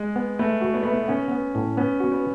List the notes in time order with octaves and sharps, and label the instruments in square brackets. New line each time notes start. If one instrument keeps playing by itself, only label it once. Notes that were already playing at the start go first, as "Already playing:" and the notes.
Already playing: [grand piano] G#3
[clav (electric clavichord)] B3
[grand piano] A3 [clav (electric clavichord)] B4
[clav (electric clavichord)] F#4
[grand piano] B3
[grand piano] A3 [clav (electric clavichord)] B4
[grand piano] B3
[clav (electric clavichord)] B3 [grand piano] C#4
[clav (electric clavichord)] B3
A2
[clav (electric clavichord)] B3 [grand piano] C#4
[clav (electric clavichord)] F#4
[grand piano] B3